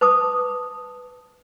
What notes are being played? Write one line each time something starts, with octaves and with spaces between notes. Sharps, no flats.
B4 A5 D6 D#6